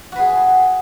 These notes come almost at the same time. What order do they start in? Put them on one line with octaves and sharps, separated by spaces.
F#4 B4 G#4